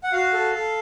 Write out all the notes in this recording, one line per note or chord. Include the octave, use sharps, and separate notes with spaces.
F#5
F#4 F5
A4
A4